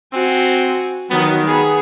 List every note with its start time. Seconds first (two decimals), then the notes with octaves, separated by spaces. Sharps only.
0.13 C4 F#4 G#5
1.10 D#3 F#3 B3
1.47 B3 G#4